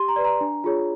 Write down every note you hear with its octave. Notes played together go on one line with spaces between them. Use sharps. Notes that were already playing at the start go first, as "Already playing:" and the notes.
Already playing: G4 C6
A#5
B4 D5
A#5
D4
F4 G#4 C#5